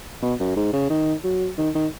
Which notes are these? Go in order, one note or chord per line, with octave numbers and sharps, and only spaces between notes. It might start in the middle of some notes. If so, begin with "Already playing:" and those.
B2
F#2
G#2
C#3
D#3
F#3
D#3
D#3